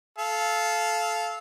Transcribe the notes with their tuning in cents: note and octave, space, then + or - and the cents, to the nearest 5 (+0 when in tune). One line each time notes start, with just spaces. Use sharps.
A4 -20 F5 -5